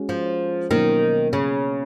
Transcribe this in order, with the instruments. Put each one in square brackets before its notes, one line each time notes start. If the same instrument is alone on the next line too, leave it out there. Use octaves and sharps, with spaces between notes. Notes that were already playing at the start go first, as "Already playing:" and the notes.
Already playing: [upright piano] G#3 C#4 F#4
[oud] F3
[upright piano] B2 F#3 A#3 C#4 [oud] D#3
[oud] C#3